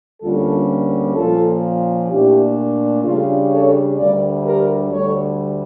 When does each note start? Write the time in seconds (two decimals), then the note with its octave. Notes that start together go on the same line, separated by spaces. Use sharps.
0.22 D2 D3 G3 A#3 C#4 F4 A4
1.16 A#2 F3 C#4 F4 A4
2.10 A#2 A3 D4 E4 G4
3.04 C#3 G3 D4 F4 A4
3.52 A4 C#5
3.98 D2 D3 G3 D4 A#4 D5
4.45 G4 A#4
4.92 D2 D3 G3 A4 C#5